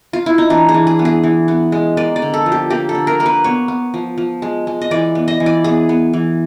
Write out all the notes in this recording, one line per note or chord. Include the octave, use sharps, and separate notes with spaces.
F4
E4
D#4
E3 D4
G#4
E3
G#4
B3
G#4
E3
B3
G#3
A#3 D5
D5
D3
A4
F3
G4
A#3 G4
A4
D3
A#4
A#3 A#4
B4
B3 C#5
B3
F3
F3
G#3
G#3
D#5
E3 D5
B3
D#5
E3
D5
B3 G#4
B3
E3